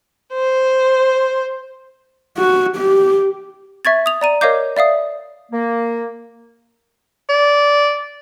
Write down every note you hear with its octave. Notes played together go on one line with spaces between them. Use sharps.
C5
F#4
G4
E5 C#6 G#6 A6
D#6 F7
D5 A#5 D#7
A#4 C#5 D#5 F5 D6 G6
D5 E5 F5 D#6
A#3
D5